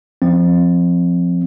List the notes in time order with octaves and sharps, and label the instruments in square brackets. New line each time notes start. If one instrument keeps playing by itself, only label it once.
[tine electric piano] F3 C4